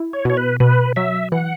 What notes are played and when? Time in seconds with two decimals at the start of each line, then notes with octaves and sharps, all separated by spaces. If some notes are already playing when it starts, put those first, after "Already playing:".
Already playing: E4
0.13 C#5
0.25 B2 C#5
0.37 B4
0.60 B2 B4
0.96 F#3 E5
1.32 E3 F#5